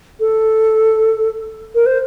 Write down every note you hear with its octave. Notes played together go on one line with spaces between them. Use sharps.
A4
A#4
C5